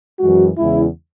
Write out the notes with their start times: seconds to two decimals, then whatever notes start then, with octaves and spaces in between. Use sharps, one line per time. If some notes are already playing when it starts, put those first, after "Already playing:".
0.20 F#2 E3 G#3 F#4
0.57 E2 C#3 G#3 E4